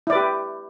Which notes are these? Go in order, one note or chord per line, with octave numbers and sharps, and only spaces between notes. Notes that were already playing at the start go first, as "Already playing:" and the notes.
E4 G4 B4 D5